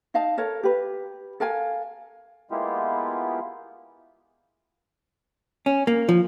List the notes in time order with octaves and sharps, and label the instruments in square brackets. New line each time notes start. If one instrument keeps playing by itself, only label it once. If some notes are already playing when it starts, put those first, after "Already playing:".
[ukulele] D#4 D#5 F5 A5
A4 A#4 C#5
G4 B4
A4 A#4 F5 G#5
[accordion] G#3 A#3 B3 E4 F4 G4
[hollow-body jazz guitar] C#4
A#3
F3